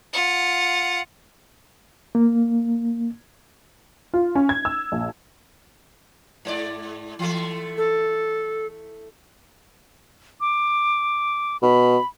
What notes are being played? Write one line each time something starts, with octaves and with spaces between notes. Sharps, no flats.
F4 F#5
A#3
F4
C#4
G#6
E6
A#1
G#2 C5 D5
E3 A3
A4
D6
B2 B5